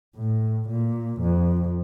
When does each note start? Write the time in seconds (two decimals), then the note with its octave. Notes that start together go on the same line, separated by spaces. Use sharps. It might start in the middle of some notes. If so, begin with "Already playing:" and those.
0.16 A2
0.68 A#2
1.21 F2